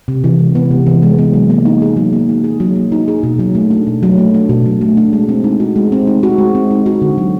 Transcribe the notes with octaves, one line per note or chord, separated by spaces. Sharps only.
C3
E3
G#3
B3
C3
E3
G#3
B3
F#3
A#3
D#4
G#4
F#3
A#3
D#4
G#4
F#3
A#3
D#4
G#4
B2
F#3
A3
D4
B2
F#3
A3
D4
B2
F#3
A3
D4
G#3
C4
D#4
F#4
G#3
C4
D#4
F#4
G#3
C4
D#4
F#4
D3
F#3